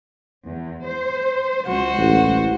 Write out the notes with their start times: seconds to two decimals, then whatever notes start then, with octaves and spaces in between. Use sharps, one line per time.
0.47 E2
0.85 C5
1.67 C#2 F#4 C5
1.98 A1